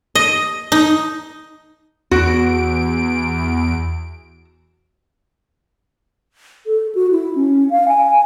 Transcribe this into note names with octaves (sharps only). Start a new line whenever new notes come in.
D#5
D#4
E2 F#4 D7
A4
F#4
E4
C#4
F5
G#5